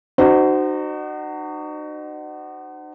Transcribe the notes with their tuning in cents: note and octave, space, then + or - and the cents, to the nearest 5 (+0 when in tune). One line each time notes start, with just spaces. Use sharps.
D#4 -40 F#4 +20 C5 -20